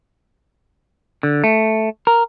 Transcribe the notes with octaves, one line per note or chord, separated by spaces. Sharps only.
D3
A3
A#4